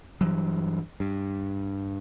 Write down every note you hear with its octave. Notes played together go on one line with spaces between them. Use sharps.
G2 E3 F#3
G2